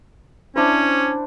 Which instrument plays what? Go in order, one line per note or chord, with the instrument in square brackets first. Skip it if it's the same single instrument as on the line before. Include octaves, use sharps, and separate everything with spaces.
[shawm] C#4 [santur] D4 E4 C5